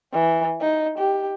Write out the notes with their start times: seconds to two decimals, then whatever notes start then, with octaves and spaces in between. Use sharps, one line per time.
0.13 E3
0.61 D#4
0.98 G4